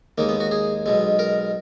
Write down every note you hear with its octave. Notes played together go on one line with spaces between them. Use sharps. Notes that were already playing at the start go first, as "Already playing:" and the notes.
D#2 D#3 G#3 A#3
B3
F#4
G#4
B1 B2 G#3
A#4